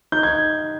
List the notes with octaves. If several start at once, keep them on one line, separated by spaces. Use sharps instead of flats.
D#4 G6
G#6